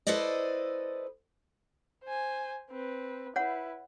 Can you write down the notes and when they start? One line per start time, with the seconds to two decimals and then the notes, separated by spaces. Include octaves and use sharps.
0.07 E4 A4 B4 C5 D5 D#5
2.04 C5 G#5
2.70 C4 B4
3.36 E4 B4 C#5 F#5